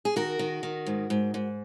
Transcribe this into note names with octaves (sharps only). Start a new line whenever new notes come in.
G#4
D#3 F#4 A#4
D#3
D#3
G#2
G#2
G#2